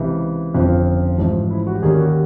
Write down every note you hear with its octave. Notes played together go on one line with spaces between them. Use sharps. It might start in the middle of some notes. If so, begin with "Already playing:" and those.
Already playing: C#2 C3 E3 G4
G1 F2 C#3 F3 F4
A1 G#2 F3
E4
F#4
G4
D#2 D#3 G3 A#3 C#4 G#4
F#4